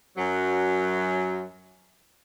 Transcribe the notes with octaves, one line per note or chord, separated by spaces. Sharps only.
F#2 F#3